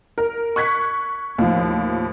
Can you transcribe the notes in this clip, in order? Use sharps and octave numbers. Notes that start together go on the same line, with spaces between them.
A#4
C#6 F#6 G#6 B6
D#2 A2 F3